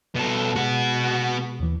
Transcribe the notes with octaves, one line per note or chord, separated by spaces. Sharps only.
B2 A4
B2 G#3 B3 F#4
D#2 E3